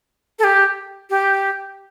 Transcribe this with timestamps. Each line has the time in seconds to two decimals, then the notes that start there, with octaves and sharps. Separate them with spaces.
0.39 A4
0.44 G4
1.10 G4